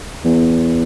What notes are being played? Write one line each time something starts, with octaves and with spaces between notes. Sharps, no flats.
E2